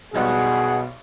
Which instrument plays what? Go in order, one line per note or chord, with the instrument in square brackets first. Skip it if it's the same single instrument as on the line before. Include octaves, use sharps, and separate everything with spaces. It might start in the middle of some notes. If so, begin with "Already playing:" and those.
[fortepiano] B1 G3 G#3 [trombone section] B2 [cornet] G#4 [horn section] F#5